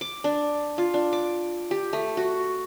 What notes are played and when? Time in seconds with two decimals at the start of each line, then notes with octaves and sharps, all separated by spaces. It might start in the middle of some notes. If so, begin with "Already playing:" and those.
0.01 D6
0.24 D4
0.78 F4
0.94 D4
1.13 D6
1.71 G4
1.93 A3
2.17 F#4